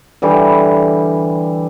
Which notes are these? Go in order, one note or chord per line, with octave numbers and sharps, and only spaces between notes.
D3 E3 G3